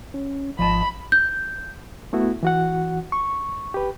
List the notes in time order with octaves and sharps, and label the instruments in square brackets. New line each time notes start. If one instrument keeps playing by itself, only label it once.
[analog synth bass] C#4
[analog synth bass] G#1 [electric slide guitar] F3 D#5 A5 [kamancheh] B5
[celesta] G6
[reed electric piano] A3 B3 E4 F#4
E3 F#4 F#5
C#6
G4 B4